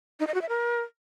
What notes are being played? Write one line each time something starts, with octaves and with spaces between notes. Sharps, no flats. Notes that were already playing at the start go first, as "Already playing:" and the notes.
D#4
D#5
F#4
E5
A#4